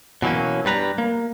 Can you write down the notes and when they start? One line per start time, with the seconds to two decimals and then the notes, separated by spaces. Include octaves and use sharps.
0.22 B2 E3 F#3 A#3 C#4
0.65 G2 G3 B4 A#5
0.98 A#3